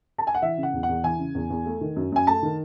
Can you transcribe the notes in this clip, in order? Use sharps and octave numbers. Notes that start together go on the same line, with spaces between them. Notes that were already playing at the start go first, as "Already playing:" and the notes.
A5
G#5
F#5
E3 E5
C#3
F#5
E2
F#5
E2
E3 G#5
C#3
E2
E2
A3
D#3
F#2
F#2 G#5
A3 A5
D#3